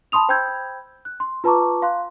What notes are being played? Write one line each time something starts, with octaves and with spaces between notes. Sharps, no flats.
A5 B5 C6 D#6 F7
C5 G5 B5 E6 G6 G#6
F#6
C6
F4 B4 A5 A#5 C#6 D6
F5 C6 F#6